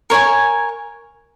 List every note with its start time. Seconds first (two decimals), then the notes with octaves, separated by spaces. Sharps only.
0.10 A#4 C#5 G#5